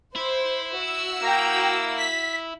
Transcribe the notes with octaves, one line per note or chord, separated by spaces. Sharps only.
E4 C5
F#4 E6
A#3 G5 A#5
B6